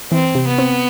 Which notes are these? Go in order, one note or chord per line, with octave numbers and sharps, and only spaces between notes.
E3 C4
C3
B3
C4